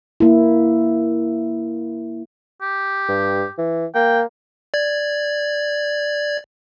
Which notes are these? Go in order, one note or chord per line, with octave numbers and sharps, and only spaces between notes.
A#3 E4
G4
G2
E3
A#3 G5
D5 G#6